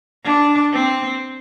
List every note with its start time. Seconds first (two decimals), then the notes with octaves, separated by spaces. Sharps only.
0.24 D4
0.72 C4